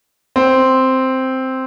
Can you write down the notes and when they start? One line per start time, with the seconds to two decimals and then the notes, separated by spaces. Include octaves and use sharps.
0.36 C4